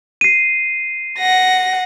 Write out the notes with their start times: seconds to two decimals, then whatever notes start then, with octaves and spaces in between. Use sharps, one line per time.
0.21 C7 D#7
1.19 F#5 A#6